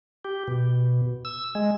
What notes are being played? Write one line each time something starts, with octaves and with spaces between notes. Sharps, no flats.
G4
B2
E6
G#3